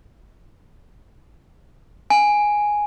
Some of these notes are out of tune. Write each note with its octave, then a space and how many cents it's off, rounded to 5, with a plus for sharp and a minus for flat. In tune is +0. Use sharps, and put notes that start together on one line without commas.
G#5 +0